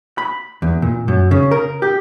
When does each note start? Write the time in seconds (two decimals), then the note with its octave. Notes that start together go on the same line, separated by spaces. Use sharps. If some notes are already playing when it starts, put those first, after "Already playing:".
0.18 B5
0.62 E2
0.82 A#2
1.08 F#2
1.31 C#3
1.51 A#4
1.82 G4